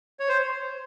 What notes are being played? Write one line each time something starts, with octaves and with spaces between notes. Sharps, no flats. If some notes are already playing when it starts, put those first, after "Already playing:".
C#5
C5